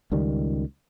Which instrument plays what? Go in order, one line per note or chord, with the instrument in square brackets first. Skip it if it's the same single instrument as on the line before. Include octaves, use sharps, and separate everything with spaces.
[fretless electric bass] C#2 D#3 G3